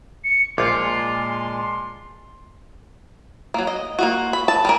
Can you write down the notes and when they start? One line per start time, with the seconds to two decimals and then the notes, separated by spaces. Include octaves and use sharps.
0.24 C#7
0.58 A#1 A#2 G#3 F4 A5 C6 D6
3.54 F#3 A#3
3.67 D#5
3.99 A#3 F4 F#4
4.33 B5
4.48 A5
4.65 G3 A#4